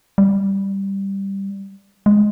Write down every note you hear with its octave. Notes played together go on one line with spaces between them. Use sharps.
G3
G#3